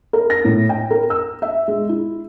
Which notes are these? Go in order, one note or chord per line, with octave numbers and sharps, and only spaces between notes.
A#4
A#6
A2
G5
A#4
E6
E5
G#3
E4